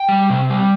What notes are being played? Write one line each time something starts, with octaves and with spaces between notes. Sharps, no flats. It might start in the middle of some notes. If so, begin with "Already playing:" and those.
Already playing: G5
G3
C3
G3